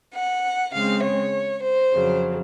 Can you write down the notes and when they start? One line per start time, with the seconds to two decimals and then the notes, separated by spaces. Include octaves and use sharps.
0.15 F#5
0.74 C#3 G#3 C4 F5
1.04 C#5
1.63 C5
1.94 F2 C#3 F#3